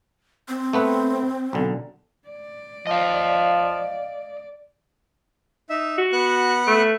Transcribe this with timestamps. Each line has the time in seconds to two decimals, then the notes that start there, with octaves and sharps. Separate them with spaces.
0.49 C4
0.73 A3 B3 B4
1.53 B1 D3
2.28 D5
2.87 F3 D#5 F5
5.70 D#4 E5
5.98 F#4
6.12 B3 F#5 F#6
6.67 A3